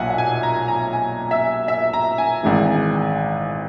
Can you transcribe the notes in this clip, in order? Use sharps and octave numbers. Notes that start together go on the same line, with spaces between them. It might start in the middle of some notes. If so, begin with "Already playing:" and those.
Already playing: B1 A#2 F#3 E5 F#5 G#5
F#5
G#5
A#5
A#5
G#5
E5
E5
A#5
G#5
G#1 G#2 E3